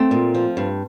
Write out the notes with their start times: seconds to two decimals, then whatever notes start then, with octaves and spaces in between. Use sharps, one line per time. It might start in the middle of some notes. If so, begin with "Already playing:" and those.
Already playing: A3 C4
0.11 A#2
0.35 F3
0.57 G2